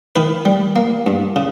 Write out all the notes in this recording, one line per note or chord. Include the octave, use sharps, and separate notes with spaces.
D#3 B4
G3
A#3
G2
C#3